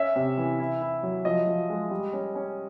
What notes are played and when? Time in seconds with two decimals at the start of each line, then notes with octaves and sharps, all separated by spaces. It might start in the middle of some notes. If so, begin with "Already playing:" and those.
Already playing: C#4 E5
0.16 C3
0.37 E3
0.59 E4
0.81 E4
1.03 F#3
1.25 F3 D#5
1.47 F3
1.69 G#3
1.91 G3
2.13 C#4
2.35 C#4